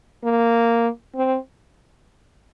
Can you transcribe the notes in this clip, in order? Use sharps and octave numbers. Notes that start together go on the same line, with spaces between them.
A#3
C4